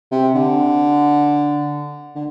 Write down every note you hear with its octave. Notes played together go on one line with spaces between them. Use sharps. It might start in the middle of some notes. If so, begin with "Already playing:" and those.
C3
D3
D3